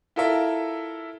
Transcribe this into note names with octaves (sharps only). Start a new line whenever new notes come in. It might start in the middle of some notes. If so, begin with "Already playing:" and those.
E4 F4 A4 A#4 E5